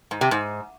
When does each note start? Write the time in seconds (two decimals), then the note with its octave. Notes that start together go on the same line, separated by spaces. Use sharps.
0.11 G#2
0.21 C3
0.31 G#2